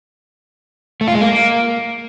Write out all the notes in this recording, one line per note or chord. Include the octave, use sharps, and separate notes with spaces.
A3
F4
G#3
A#3